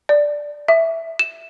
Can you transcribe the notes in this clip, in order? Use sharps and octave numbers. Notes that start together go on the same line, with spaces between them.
D5
E5
E7